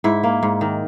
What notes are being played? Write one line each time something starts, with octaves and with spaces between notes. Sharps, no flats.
G#2 E4
A#3
G#2
D#3